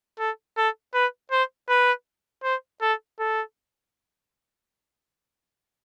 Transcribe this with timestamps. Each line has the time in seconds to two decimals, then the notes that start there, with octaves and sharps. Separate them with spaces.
0.19 A4
0.57 A4
0.94 B4
1.32 C5
1.69 B4
2.44 C5
2.82 A4
3.19 A4